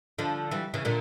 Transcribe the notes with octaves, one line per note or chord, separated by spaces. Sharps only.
D3 F3
E3 G3
C#3 E3
A#2 D3